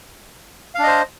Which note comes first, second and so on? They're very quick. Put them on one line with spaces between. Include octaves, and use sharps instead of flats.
F5 D4 D#5 C5